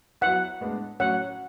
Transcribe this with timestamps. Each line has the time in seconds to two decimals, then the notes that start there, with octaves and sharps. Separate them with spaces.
0.21 F#3 B3 E4 F#5
0.61 A2 G#3 B3 D4
1.00 A2 F#3 C#4 F#5